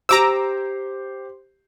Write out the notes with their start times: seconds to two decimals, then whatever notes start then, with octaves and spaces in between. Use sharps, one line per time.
0.09 G4 C5 A#5 D6 E6